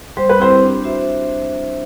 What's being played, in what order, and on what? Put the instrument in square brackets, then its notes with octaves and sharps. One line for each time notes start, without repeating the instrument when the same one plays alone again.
[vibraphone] G3 [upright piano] C5
[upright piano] B4
[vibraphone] C4 E4 G4 [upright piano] C5
[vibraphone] D4
F#4 C5 E5